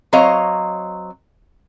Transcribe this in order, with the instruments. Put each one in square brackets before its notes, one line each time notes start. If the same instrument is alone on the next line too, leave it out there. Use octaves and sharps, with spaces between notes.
[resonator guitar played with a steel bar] F#3 C4 C#5 D#5 F5 A#5